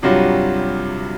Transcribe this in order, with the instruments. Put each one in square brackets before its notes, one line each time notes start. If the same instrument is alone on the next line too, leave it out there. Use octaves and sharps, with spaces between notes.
[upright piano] G2 C3 F#3 G3 F4 F#4